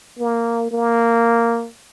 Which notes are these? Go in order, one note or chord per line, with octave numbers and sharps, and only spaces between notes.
A#3
A#3